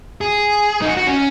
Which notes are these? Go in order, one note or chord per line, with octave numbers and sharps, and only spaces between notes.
G#4
D#4
F#4
F#4
C#4